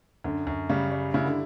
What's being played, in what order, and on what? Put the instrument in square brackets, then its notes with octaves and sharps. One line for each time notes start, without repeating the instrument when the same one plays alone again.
[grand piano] F#2 [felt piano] D3
[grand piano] F#2
[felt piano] C#3 [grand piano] G3
[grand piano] G3
[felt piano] C#3 [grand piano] E4
[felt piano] D3